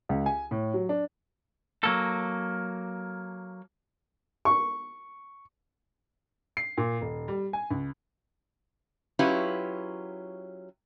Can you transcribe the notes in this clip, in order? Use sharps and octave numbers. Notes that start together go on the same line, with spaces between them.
C#2
G#5
A2
F#3
D4
F#3 A#3 A4
C#6
C7
A#2
D#1
G3
G#5
C#2
F#3 C#4 E4 F4 G4 B4